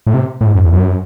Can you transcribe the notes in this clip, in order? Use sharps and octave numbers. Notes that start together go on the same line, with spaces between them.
A2
C3
A2
G#2
F#2
E2
F#2